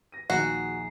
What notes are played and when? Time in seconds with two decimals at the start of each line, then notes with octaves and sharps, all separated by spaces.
0.12 A#6 D#7
0.30 D#1 A#1 D#3 F#4 G#4 A#5 C7